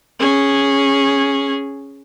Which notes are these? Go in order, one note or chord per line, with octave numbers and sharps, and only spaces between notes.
C#4 G#4